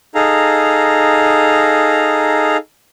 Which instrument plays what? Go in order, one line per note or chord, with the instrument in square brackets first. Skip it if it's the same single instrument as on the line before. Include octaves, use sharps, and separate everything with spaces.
[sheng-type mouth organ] D#4 G#4 A4 F5 A#5